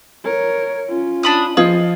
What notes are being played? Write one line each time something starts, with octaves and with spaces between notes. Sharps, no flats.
A#4 C#5
C#4 F4
D4 B5 D#6
F3 F4 G#4 D#5